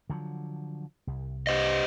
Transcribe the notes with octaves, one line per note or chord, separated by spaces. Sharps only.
D3 F3 F#3
C2
G4 C5 D#5